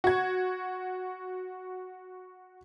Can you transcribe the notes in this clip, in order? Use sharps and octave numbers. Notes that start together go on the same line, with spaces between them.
F#4 G#6